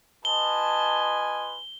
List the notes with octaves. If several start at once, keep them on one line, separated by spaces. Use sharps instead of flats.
F4 B4 D#5 G#5 A5 G7